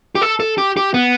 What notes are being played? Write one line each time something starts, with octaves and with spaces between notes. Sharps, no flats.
G4
A4
A4
G4
G4
B3